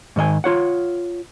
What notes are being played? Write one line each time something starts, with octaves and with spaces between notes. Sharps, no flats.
G#2 D#3 D#5 G#5
F4 C#5 F#5